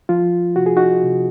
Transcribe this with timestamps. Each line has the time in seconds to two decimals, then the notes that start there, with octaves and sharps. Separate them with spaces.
0.09 F3 F4
0.56 C3 F#4
0.66 G#4
0.76 D#4 F#4
1.03 C3